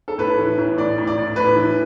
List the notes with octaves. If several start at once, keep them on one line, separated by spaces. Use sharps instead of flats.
A4
A2 B4
E3
A2
A2 D5
A2
D5
A2
A2 B4
E3